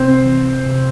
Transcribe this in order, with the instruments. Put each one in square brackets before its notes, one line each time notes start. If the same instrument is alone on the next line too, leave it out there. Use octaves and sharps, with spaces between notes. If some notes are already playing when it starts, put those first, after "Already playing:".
Already playing: [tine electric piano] C3 [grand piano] C4 C5
[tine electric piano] E3
C3